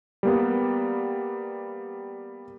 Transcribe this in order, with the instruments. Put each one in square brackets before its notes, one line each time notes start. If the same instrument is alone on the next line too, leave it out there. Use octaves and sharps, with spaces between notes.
[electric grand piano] G3 A#3 B3